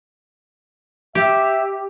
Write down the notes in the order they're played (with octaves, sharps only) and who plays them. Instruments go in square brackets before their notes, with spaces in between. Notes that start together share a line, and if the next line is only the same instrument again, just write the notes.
[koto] G4 [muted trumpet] E5